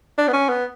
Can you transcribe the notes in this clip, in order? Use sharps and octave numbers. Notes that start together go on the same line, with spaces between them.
D4
B3
C#4
B3